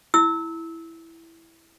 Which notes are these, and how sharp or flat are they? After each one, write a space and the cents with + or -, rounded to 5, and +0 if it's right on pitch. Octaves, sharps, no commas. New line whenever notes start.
E4 +0 E6 -25